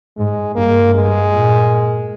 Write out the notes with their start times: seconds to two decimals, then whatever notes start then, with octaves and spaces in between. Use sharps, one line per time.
0.17 G#2 G#3
0.55 G2 A#3
0.94 G2 G#3
1.32 A#2